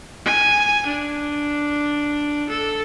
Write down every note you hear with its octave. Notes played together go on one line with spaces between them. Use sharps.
G#5
D4
A4